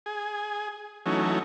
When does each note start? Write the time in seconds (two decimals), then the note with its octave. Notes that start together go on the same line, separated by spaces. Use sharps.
0.06 G#4
1.06 E3 F#3 A3 C#4 D#4